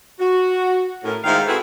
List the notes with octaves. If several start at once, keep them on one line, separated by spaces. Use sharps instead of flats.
F#4
A2 C#4 A#4
G#2 D#3 E4 F4 F5
C4 E4 F#4 G#4 A4 B4